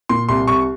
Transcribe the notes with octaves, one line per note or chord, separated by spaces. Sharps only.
A#2 C6
C2 C6
C2 C#6